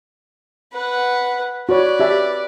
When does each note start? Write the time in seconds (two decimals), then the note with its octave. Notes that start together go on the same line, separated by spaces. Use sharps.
0.73 B4 F#5
1.69 F#4 B4 C#5 D5
2.00 G4 E5 A5